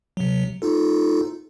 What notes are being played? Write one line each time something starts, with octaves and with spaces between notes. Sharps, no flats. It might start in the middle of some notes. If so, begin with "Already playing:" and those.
C3 F#3
D#4 F4 A4